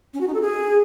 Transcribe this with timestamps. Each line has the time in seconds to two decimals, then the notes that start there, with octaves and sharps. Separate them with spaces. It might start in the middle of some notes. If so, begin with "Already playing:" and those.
0.14 C#4
0.20 F#4
0.27 D#4
0.34 A4
0.41 G#4